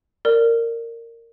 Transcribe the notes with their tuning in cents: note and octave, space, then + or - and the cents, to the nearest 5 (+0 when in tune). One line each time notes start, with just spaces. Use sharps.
A#4 -15 D5 +0